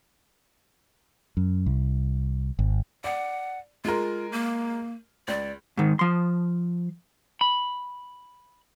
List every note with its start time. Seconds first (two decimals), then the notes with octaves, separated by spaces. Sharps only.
1.37 F#2
1.66 C2
2.59 G#1
3.04 D5 F#5
3.85 G#3 F4 A#4
4.32 A#3
5.28 C#2 D5
5.77 G#2 D#3
5.99 F3 C6
7.41 B5